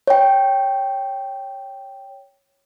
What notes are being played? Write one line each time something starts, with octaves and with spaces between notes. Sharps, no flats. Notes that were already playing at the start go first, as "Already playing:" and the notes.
C#5 G5